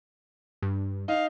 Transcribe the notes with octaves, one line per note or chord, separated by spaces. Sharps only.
G2
D#4 F5